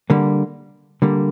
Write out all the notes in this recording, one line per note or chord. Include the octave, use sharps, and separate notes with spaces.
D3 G3 A#3
D3 G3 A#3